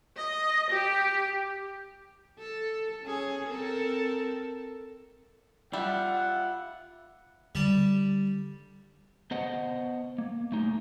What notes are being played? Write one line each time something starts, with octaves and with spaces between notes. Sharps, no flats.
D#5
G4
A4
C#4 G#4
C4 A4 A#4
G3 F4 E5 F#5
D3 G3 A5
B3 C5 D#5 F#5
A#3
A3 D#4